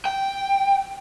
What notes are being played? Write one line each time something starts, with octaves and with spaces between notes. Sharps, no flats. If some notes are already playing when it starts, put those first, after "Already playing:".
G5